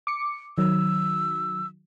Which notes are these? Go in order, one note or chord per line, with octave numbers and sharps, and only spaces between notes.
D6 C#7
D#3 F#3 E6